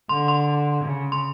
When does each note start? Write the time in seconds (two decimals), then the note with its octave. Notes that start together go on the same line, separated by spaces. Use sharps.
0.09 D3 C6
0.28 C6
0.84 C#3
1.12 C6